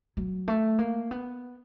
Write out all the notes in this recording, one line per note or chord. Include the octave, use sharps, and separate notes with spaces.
F#3
A3
A#3
B3